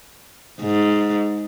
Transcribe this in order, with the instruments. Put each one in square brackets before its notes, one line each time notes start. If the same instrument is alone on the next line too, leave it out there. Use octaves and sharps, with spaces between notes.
[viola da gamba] G#2